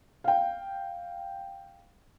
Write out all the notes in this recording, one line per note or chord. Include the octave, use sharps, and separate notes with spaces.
F5 G5